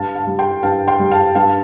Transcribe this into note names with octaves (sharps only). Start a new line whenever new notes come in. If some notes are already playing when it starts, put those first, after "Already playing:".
Already playing: G2 F5 A5
F5 A5
G3
G5 C6
G2 F5 A5
G5 C6
G3
F5 A5
G2 F5 A5